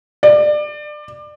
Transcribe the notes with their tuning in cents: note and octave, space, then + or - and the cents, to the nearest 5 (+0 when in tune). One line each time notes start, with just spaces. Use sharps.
D5 +25